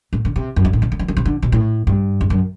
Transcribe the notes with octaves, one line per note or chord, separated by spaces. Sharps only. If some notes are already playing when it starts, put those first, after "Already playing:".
A2
D3
C3
F#2
G2
A2
C3
D3
E3
D3
C3
D3
B2
A2
G2
E2
F#2